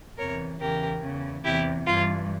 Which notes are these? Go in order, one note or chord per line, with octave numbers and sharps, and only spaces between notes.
E2 C3 E3 A#4 C#5
E2 C#3 E3 G4 A#4
E2 C#3 E3
E2 C3 E3 E4 G4
G2 E3 F4